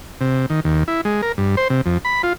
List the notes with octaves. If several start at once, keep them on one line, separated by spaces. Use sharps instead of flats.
C3
D#3
D#2
E4
G#3
A#4
G2
C5
C3
F2
B5
F4